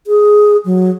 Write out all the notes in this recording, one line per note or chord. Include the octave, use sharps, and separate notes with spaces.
G#4
F#3